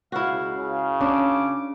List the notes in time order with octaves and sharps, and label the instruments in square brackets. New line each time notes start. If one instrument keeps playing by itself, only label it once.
[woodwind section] C#2 F5 [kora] E4 F#4
[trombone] C#3
[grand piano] C#4 [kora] D4 [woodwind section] D6